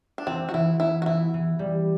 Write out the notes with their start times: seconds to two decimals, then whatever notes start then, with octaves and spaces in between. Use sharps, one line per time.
0.18 D4
0.27 E3 C4
0.49 F#4
0.54 E3 E4
0.80 B3 E4
1.02 F#4
1.06 E3 E4
1.34 E3
1.59 G3